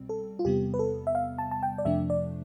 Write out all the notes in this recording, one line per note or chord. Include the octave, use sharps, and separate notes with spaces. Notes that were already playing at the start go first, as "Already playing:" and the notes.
Already playing: C2 B2 G3 C4
A4
F4
E2 C3 G3 B3 G4
B4
A4
E5
F5
A5
A5
G5
D5
F2 C3 F3 A3 D4 E5
D5